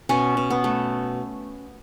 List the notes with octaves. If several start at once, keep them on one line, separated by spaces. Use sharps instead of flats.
B2 C#4
B2
B3
A3